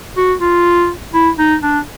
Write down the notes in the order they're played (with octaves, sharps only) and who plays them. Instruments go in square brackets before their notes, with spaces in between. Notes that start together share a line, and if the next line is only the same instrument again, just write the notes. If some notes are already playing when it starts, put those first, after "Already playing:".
[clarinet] F#4
F4
E4
D#4
D4